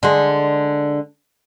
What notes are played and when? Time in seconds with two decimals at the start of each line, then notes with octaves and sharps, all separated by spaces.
0.03 D3 G#3